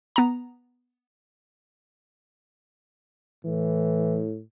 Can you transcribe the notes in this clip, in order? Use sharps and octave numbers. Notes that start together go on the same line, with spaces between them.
B3 A#5
A2 E3